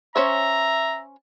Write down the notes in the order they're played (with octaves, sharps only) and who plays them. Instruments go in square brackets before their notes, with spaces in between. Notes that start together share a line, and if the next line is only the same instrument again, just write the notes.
[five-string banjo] C#4 C5 C#5 [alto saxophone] E5 [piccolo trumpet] A#5